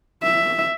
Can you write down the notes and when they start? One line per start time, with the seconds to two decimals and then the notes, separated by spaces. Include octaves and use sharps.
0.23 E5